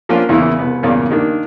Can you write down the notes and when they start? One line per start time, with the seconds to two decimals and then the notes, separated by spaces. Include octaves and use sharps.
0.09 F3 A#3 C#4 D4 F4
0.29 E2 C#3 E3 A#3 E4
0.59 C2 B3
0.83 E2 G2 A#2 C#3 A#3 D5
1.11 D#3 A#3 D4